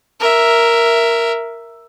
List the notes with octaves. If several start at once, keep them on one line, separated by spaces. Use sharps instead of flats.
A#4 E5